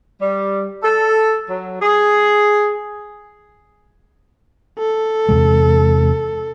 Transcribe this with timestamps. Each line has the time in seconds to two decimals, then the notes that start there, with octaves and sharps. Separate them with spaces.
0.21 G3
0.83 A4
1.48 F#3
1.81 G#4
4.79 A4
5.29 E2 C3 G#3